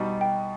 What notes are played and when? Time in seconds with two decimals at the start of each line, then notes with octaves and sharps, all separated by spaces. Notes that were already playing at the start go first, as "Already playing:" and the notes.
Already playing: B2 G3 D#4
0.21 G5